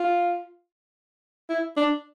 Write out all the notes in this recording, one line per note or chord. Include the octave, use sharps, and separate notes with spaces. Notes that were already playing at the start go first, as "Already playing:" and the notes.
Already playing: F4
E4
D4